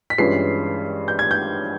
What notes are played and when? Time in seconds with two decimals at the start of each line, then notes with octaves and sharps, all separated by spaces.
0.10 B6
0.18 G2 E3 G#3 C#4 F4 C7
1.08 G6
1.19 G#6
1.31 G6